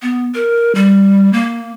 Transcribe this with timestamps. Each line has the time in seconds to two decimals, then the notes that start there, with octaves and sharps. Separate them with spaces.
0.02 B3
0.34 A#4
0.75 G3
1.33 A#3